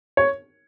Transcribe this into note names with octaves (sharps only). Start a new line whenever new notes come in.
C#5